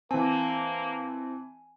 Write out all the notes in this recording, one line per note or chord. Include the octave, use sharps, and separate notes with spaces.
E3 A#3 C4 G#5 A5